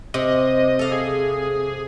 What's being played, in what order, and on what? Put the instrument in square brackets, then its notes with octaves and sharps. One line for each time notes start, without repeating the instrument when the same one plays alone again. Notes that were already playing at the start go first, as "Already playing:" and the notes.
[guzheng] C3 [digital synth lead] D#5
[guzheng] A4 F5
[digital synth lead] G#4